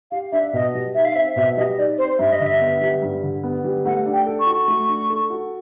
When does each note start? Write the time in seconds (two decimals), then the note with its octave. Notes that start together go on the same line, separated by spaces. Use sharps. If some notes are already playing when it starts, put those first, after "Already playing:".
0.11 G4 F5
0.32 D4 E5
0.53 B2 D#5
0.74 G3
0.95 D#4 E5
1.05 F5
1.15 C4 E5
1.36 B2 E5
1.57 G3 D#5
1.77 D#4 D5
1.98 C4 C5
2.19 G2 E5
2.32 D#5
2.40 D3
2.46 E5
2.61 B3
2.81 G3
3.02 G2
3.23 D3
3.43 B3
3.64 G3
3.85 A3 F#5
4.06 D4
4.13 G5
4.26 A4
4.40 C#6
4.47 F#4
4.64 A3 C#6
4.89 D4
5.10 A4
5.30 F#4